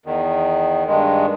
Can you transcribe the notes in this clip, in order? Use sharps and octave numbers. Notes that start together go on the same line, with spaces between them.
E2 D#3
G2 D#3 G#3